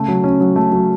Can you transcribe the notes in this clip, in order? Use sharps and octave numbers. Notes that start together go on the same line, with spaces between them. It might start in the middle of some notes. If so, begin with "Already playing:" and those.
Already playing: C#3 A3
F#3
C#4
F#3
A3
F#3